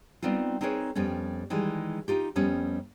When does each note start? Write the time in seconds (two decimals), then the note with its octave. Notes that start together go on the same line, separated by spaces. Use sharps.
0.22 G3 B3 C4 D#4 F4
0.61 C4 D#4 G#4 A#4 B4 C#5
0.95 F2 G3 B3 C#4
1.50 D#3 E3 G3 G#3
2.08 D#4 F4 G4
2.36 F2 G3 B3 C#4